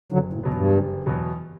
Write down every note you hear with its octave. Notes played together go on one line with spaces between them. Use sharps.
F#1 D3 F#3
A2
E2 B2 F#3 B3
G2
F#1
E2 B2 F#3 B3